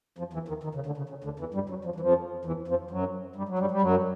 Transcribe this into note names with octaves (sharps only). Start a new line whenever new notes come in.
F2 F3
E2 E3
D#2 D#3
D#2 D#3
C#3
D2 D3
C#3
C#3
D2 D3
E2 E3
G2 G3
F#2 F#3
F2 F3
E3
F2 F3
E2 E3
F2 F3
F#2 F#3
G2 G3
F#3
G2 G3
G3
F#2 F#3